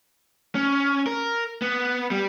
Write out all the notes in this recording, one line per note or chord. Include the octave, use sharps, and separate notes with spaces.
C#4
A#4
B3
G3